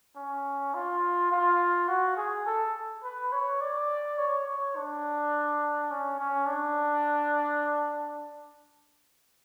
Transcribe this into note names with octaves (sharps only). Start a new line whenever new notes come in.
C#4
F4
F4
F#4
G#4
A4
B4
C#5
D5
C#5
C#5
D4
C#4
C#4
D4